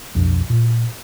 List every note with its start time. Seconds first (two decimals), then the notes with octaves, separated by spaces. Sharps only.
0.15 B1 F2 D4
0.50 A#2